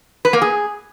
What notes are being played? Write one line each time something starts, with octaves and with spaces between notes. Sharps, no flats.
B4
A#3
G#4